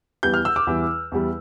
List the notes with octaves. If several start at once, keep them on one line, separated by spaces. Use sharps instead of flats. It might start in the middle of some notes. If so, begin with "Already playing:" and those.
E2 E3 G3 G6
F6
E6
D6
E2 E3 G3
E2 E3 G3